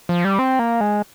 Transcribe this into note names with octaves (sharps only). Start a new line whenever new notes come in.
F3
G3
C4
A#3
G#3